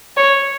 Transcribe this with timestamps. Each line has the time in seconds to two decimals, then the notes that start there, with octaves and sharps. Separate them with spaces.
0.17 C#5